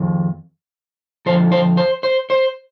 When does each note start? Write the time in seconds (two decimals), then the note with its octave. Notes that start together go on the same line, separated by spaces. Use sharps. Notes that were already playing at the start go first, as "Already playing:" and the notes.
Already playing: F2 D#3
1.26 F2 D3 F3 C5
1.52 C5
1.77 C5
2.03 C5
2.30 C5